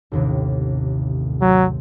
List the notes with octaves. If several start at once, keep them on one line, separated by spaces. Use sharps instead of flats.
A1 D#2 C3
F#3 C4